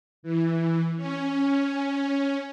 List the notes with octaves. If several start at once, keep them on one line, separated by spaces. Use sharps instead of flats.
E3
C#4